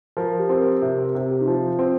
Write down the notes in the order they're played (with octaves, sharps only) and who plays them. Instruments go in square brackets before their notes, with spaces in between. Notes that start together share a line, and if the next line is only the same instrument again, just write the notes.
[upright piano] F3 [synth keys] A#4
[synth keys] G4
[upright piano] C4
[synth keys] A#4
[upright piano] C3 [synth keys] G4
[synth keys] G4
[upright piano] C3 [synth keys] A#4
[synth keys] G4
D#4
[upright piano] F3 [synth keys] F4
[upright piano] C4